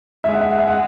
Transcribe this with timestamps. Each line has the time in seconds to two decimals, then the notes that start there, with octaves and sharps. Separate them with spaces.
0.24 G#3 E5
0.34 F#5
0.41 E5
0.51 F#5
0.58 E5
0.68 F#5